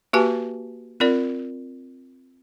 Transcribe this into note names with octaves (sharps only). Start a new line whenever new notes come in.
A#3 F#4 G4 B4 G#5 A5
C4 F4 A#4 D5